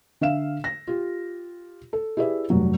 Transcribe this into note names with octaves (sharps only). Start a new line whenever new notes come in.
D3 E5 F5 E7
A#6
F4 G4
A4
E4 G4 G#4 B4 D5 E5
F1 G2 F#3